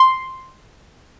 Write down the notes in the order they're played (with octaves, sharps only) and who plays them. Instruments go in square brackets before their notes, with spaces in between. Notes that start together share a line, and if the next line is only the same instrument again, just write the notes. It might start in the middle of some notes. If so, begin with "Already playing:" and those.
Already playing: [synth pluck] C6